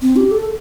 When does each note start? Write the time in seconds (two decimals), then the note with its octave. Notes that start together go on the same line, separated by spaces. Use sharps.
0.02 C4
0.16 G4
0.31 A4